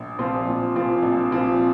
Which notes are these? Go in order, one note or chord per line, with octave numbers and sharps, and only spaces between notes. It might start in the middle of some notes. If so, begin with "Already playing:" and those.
Already playing: A#1
A#2 F3 C4 F4
A#1
A#2 F3 C4 F4
A#1
A#2 F3 C4 F4